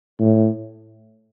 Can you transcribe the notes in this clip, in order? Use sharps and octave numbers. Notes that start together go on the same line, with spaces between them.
A2